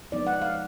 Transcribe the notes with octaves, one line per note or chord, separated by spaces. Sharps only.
F3 G#3 B3 D#4 D5
F#5
F5